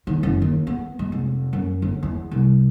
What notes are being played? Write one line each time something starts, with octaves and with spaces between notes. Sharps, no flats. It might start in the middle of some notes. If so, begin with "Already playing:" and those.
D#3
F#1
D#2
B3
G#3
F1
F#2
G1
E2
C2